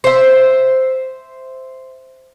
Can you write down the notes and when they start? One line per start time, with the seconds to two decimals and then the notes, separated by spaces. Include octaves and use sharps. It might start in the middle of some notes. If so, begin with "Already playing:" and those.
0.04 C5 E5